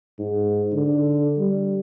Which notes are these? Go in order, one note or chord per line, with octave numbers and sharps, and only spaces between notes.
G#2
D3
G3